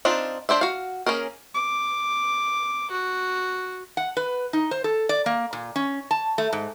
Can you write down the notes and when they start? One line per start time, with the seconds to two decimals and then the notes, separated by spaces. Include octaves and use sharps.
0.05 C4 D4 D#4 F4
0.49 D4 C5 D5 E5
0.61 F#4 F5
1.06 A#3 C#4 G#4 A#4
1.54 D6
2.91 F#4
3.97 F#5
4.17 B4
4.53 D#4
4.71 C5
4.84 A4
5.09 D5
5.26 A#3
5.53 A#2
5.76 C#4
6.11 A5
6.38 A3
6.53 G#2